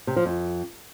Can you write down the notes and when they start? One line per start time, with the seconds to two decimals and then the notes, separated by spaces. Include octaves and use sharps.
0.07 C3
0.16 F3
0.25 F2